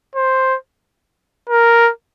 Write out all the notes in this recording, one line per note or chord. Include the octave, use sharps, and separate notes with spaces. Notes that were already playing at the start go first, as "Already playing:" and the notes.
C5
A#4